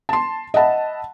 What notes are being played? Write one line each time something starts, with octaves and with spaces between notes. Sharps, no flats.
A5 C6
D#5 E5 F#5 A5 B5